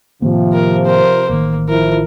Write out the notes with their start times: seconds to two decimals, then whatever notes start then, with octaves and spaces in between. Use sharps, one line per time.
0.22 A2 C3 D#3 F3 A#3
0.53 A#4
0.86 A#4 C5
1.29 A1 D#3 A#3
1.69 F3 E4 A#4